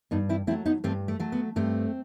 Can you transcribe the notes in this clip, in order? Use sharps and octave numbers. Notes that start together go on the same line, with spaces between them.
G2 B3 D#4
C4 E4
F#3 A3 C4 E4
B3 D#4
G2 A3 C4
A3
F#3 A3
B3
G2 A3 C4